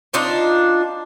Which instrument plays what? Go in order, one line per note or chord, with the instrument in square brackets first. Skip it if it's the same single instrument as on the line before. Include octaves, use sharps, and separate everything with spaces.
[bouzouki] D4 D#4 F4 C5